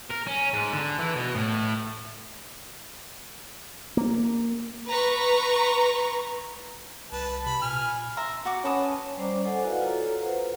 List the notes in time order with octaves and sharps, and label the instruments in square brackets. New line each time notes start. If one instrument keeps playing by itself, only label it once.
[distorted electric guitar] A#4
C#4
G#2
D3
E3
B2
A2
[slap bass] A#3
[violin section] B4 A#5 C#6
[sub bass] C2 [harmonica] B4 A5
[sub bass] C3 [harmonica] B5
[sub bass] A#2 [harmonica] G#5 F6
[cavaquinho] E5 A#5 C6
F#4 F#5 D6
[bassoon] C#4 [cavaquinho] B4 A5 D#6
[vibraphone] G3 C#4 C5 D5 A#5 D6
A4 C5 D#5 F#5 G#5
E4 F#4 B4 D5 D#5 F5
F4 F#4 A4 C#5 A#5
F4 B4 C5 F#5